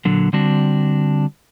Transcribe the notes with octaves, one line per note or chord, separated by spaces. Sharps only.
A#2 D3 F#3
D3 G3 C4 D4 F#4